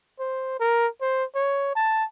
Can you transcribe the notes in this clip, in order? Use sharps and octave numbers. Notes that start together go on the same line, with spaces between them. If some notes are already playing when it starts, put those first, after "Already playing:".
C5
A#4
C5
C#5
A5